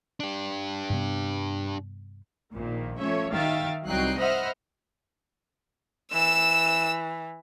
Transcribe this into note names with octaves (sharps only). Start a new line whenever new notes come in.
D4 G4
G2 C3 B3
A#1 A#2 D#3
F3 A3 C#4 C#5 E5
D#3 E5 F5 G5 A6
C2 F#3 D#4 G5 F#6 C7
C5 D#5 E5 F#5 B5 F6
E3 E6 E7